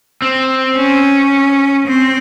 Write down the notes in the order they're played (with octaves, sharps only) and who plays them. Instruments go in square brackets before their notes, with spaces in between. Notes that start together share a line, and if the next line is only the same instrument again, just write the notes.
[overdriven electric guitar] C4
[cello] C#4
C4